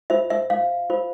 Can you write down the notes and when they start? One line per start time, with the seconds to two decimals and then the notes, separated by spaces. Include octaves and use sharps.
0.10 F4 C5 E5
0.30 E5
0.50 F5
0.90 F4 C5